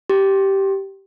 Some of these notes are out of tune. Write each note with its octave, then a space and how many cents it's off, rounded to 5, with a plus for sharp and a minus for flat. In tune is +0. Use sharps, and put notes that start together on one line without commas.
G4 -10